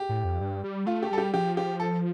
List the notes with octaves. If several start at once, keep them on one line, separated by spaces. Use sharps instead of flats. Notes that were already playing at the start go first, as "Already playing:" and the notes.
Already playing: G4
A2
F2
G2
G3
A3 F4
G4
G3 A4
G4
F3 G4
G4
A4